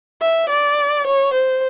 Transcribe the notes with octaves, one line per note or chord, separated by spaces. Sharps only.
E5
D5
C#5
C5